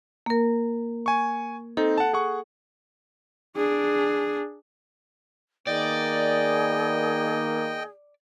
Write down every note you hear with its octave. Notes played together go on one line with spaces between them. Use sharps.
A#3 A#4
G#5 C#6
C4 D#4 A4
F#5 A5
G#4 F#5 C#6
D4 G#4
D#3 A#3 B3 G#4 D5 D#5 G5